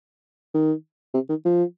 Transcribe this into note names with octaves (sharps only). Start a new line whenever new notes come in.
D#3
C3
D#3
F3